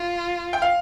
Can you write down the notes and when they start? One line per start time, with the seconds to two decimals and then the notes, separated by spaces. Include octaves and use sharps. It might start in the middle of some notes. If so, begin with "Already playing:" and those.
Already playing: F4
0.53 G5
0.62 F5